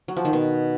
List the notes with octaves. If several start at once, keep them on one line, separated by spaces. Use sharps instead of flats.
F#3
F3
D#3
B2